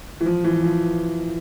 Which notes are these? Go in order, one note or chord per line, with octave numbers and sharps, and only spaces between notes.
E3
F3
E3
F3